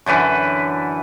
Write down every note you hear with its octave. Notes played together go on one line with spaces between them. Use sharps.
F#2 D3 E3 B4